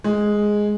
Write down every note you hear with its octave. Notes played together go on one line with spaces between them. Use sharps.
G#3